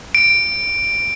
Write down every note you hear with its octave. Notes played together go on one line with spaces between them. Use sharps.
D7